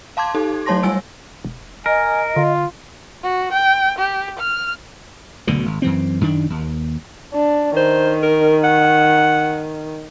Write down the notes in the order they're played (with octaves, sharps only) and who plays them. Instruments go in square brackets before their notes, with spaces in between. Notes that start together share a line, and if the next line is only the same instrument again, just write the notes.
[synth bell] F5 A5 C6 D6 G#6
D#4 G4 A4
F#3 A3 C#5 A5 C6 A#6
G3 G#5 E6 D7
[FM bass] E1
[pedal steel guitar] A#4 [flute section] D#5 [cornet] G#5
[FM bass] D3 [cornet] F4
[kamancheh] F#4
G5
G4
F6
[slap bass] F#1 D2 B2 D3
G#1
F#2 E3 C4
F#2 D#3 D4
D#2
[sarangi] D4
[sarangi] D#3 [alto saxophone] C5
[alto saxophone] A#4
F#5